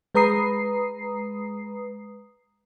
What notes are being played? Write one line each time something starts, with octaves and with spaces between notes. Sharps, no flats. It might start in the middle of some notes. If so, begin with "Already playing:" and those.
G#3 B4 A#5 D#6 C7